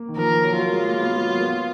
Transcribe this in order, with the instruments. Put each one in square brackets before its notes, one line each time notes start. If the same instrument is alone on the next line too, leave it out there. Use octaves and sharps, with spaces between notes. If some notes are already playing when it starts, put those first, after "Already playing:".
Already playing: [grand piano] A#3
D#3
[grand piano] F3 [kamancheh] A#4
[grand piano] D#3
F#3
[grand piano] F#3 [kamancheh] F4
[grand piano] G#3
A#3
B3
G#3
F#3
B3